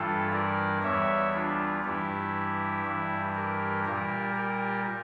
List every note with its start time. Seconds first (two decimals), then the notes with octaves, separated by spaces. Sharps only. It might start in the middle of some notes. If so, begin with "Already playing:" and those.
Already playing: G2 E3 G3 F4 A4
0.33 A#4 D5
0.83 E2 E3 G3 C#5 E5
1.34 D4 F4
1.84 G2 E3 G3 E4 G4
2.86 G2 E3 G3
3.35 G4 A#4
3.85 A#2 G3 G4 A#4
4.36 G4 A#4